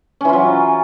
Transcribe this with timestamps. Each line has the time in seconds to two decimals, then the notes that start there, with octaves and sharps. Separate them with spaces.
0.21 C#4
0.25 E3
0.29 F4
0.33 F#3